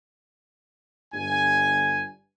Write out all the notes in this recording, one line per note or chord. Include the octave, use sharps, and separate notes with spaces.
G1 G2 G#5